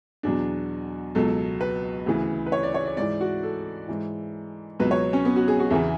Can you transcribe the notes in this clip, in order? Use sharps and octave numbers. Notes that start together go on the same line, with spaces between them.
E2 B2 F#3 D4
C#2 B2 F#3 A4
B4
D2 C#3 E3
B4
C#5
D5
C#5
D5
G#2 E3 D5
F#4
A4
G#2 E3
C#2 B2 F#3 B4
C#5
C#4
B3
F#4
G#4
F#4
E2 C#3 E3 E4